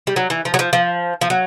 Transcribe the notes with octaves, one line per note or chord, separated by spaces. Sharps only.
G3
F#3
E3
F3
F#3
F3
F3
F3
F#3